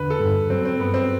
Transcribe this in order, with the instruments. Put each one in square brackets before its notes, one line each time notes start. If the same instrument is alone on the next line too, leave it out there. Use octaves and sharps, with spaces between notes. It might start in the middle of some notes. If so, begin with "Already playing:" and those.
Already playing: [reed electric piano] E2 D3 [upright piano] B4
[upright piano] A4
[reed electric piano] G2
[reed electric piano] F#3 [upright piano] C4
[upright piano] C4
[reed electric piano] G2 [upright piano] B3
[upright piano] C4